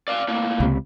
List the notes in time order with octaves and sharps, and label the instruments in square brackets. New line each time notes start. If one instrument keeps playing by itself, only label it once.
[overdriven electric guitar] D5 F5
A2 A#3
[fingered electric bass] C#2 C3